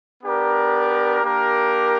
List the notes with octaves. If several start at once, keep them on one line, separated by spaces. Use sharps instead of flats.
B3 D4 G4 A#4 D5
A#3 D4 G4 A#4